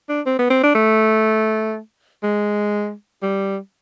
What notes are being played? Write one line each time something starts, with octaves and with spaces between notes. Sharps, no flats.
D4
C4
B3
C4
D4
A3
G#3
G3